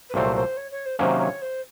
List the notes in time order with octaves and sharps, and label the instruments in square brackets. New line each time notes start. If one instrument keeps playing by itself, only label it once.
[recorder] B4
[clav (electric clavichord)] C2 A#2 F#3 A3 C4 [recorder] C5
[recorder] C5
C#5
C#5
C5
[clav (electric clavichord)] C3 D#3 F#3 A#3 C#4 [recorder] C5
[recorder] C#5
C5